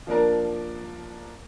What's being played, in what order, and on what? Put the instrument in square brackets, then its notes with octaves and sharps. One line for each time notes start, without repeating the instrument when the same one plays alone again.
[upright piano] F3 A#3 D4 A#4